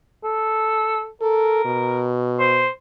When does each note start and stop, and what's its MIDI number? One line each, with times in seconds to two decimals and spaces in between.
0.23 1.08 69
1.22 1.64 69
1.22 2.12 70
1.65 2.66 47
2.39 2.69 72